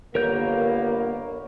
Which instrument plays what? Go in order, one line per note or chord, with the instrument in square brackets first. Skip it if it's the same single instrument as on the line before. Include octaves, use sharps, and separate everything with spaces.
[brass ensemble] G1 A#3 B3 [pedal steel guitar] A#4 C#5 G6